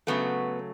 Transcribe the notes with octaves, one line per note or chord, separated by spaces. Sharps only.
C#3 F#3 A3 B3